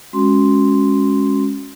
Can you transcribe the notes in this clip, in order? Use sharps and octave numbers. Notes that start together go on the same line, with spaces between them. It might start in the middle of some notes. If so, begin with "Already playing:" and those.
G#3 C#4 F#4 C6